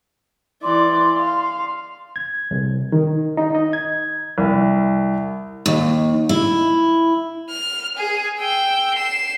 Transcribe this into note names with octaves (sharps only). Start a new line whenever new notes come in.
E3 D5 C6
F5
G#6
C2
D#3
D#4
D#5
G#6
C2
D#2
E4
F6
G#4
G5 E6
C7 E7